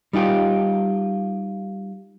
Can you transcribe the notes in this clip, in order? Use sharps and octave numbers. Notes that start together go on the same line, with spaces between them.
G3 D#4 F4 G4